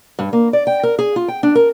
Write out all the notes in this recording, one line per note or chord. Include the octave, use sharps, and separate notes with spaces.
G2
A#3
D5
G5
A#4
G#4
F4
G5
D4
A#4